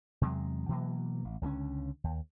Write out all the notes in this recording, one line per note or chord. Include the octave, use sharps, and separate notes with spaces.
E2 C3 F#3 G#3
B2 E3 F#3 A#3
A1
C#2 D3 E3 C#4
D#2